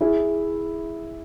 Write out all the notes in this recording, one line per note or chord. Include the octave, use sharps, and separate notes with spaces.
E4 G#4